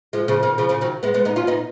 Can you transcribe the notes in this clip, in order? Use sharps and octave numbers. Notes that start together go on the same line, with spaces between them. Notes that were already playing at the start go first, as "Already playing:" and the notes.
F3 G#3
C#3 F3
B2 D#3
C#3 F3
C#3 F3
D#3 F#3
G#3 B3
G#3 B3
B3 D#4
C#4 F4
B3 D#4